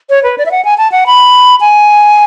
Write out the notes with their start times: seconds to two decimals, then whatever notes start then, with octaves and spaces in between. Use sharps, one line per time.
0.10 C#5
0.23 B4
0.38 D5
0.46 E5
0.51 F#5
0.65 G#5
0.78 A5
0.92 F#5
1.06 B5
1.61 G#5